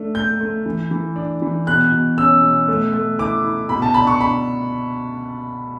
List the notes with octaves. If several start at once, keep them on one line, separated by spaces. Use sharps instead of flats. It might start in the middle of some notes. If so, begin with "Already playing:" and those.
Already playing: A3 D4
A3 G6
A3
E3
E3
D4
E3
B2 F#6
B2
C#4 E6
B2
A3
A3
E4 D6
E4
B2 B5
A5
D4 B5
C#6
D4 B5